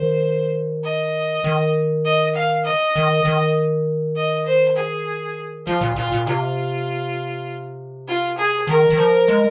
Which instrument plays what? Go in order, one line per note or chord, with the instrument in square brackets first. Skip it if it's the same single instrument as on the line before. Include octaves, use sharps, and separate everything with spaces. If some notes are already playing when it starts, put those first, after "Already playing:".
Already playing: [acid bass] D#3 [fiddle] C5
[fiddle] D#5
[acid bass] D#3
[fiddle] D#5
F5
D#5
[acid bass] D#3
D#3
[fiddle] D#5
C5
G#4
[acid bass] F3 [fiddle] F4
[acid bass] A#2
[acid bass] A#2 [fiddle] F4
[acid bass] A#2
[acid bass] C3 [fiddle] F4
[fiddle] F4
G#4
[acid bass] D#3 [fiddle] A#4
[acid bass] D#3
F3
G#3